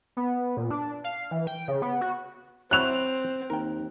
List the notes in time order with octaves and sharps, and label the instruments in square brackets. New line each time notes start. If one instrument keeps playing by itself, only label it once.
[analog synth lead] B3
A#2
D4
F5
E3
G5
C#3
B3
F#4
[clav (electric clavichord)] F#3 E4 F#4 [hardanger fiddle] C4 [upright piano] F#6 F7
[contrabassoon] D#2 [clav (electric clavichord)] A#4 G5